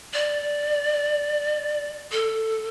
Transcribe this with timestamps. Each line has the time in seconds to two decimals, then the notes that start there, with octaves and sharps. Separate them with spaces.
0.13 D5
2.12 A4